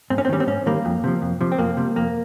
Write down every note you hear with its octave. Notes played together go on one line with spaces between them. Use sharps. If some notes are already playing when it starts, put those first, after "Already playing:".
G#2 C4
C#4
C4
D#3 G3 C#4
C4
G#2 C#4
D#3 G3 A#3
F2
C3 F3
F2
C3 F3
C4
F2 A#3
C3 G3
F2 A#3